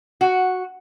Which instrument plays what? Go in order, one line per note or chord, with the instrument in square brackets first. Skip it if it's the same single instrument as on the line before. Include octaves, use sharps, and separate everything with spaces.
[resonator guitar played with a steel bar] F#4